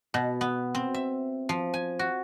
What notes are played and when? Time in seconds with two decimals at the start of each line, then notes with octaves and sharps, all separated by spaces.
0.14 B2
0.41 B3
0.75 C4
0.94 E5
1.49 F3
1.74 G#5
1.99 F#4